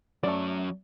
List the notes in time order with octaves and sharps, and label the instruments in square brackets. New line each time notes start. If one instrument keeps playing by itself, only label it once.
[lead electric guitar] F#3 C#4 [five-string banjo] A3 D5